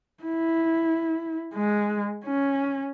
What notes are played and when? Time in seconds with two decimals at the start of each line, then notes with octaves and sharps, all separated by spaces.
0.23 E4
1.54 G#3
2.25 C#4